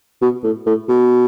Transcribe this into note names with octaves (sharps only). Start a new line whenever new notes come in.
B2
A2
A2
B2